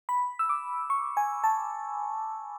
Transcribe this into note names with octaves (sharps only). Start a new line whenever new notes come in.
B5
E6
D6
C#6
G#5
A5